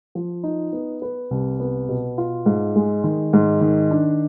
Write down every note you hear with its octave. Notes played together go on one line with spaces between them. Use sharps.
F3
D#4
B3
B4
C2
B3
B2
F4
G#2
G#3
D#3
G#2
D#3
D4